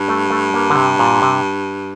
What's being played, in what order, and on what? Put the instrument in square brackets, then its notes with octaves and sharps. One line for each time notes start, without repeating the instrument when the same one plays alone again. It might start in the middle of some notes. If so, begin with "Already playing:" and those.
Already playing: [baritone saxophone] G2
[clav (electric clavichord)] A3
A3
A#3
D3
C3
A#2
C3